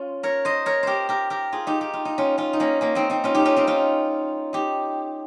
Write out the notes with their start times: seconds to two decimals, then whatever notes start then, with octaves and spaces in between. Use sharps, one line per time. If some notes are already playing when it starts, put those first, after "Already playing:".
Already playing: C#4 F4
0.23 A#4 C#5
0.45 C5 D#5
0.66 A#4 C#5
0.83 G4 A#4 C5
1.09 G4 A#4
1.30 G4 A#4
1.52 F4 G#4
1.67 D#4 G4
1.81 G4
1.93 F4
2.05 D#4
2.18 C#4 F4
2.38 C#4 F4
2.53 D#4
2.60 A#3 C#4
2.81 A#3 C#4
2.95 C4 D#4
3.10 C4 D#4
3.24 C#4 F4
3.35 D#4 G4
3.45 C#4 F4
3.56 C4 D#4
3.67 C#4 F4
4.53 D#4 G4